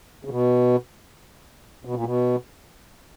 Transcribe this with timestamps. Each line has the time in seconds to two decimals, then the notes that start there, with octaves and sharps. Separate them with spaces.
0.25 C#3
0.30 B2
1.85 B2
1.95 A#2
2.05 B2